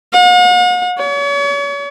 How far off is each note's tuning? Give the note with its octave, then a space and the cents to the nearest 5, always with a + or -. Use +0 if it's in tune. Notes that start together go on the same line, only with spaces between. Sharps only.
F#5 -45
C#5 +40